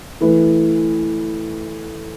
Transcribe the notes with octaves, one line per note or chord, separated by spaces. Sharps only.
E3 A3 E4 B4